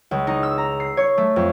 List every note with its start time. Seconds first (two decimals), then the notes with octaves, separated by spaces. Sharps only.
0.11 C#2
0.27 D#4
0.43 E6
0.58 A#5
0.80 C7
0.97 C#5
1.18 A3
1.36 F2